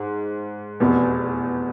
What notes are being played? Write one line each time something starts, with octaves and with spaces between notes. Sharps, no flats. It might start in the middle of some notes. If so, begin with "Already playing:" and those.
Already playing: G#2
F1 E2 B2